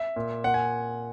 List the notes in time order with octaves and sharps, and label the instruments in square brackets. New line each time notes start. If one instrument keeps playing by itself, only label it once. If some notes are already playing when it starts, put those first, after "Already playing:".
Already playing: [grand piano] E5
A#2
A#2 F#5
G#5